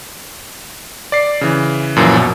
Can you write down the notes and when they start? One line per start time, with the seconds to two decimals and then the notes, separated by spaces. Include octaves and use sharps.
1.12 D5 C7
1.41 C#3 E3
1.96 F#2 A#2 E3 F3
2.16 B2